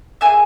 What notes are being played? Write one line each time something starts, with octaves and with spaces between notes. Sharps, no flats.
A#3 D#4 G#4 E5 G#5